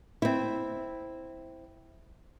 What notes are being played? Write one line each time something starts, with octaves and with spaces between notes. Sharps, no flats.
C4 E4